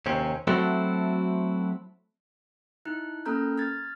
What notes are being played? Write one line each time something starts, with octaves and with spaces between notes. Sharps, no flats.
D#2 C3 C4 C#4
F#3 A3 C4 E4 F#4 A4
D#4 E4 F#6
A#3 C#4 A4 A#5 F6 G6
F6 G#6 A6